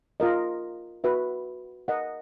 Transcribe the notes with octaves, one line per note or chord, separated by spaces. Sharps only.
F4 A#4 D#5
F#4 B4 E5
A#4 D#5 F#5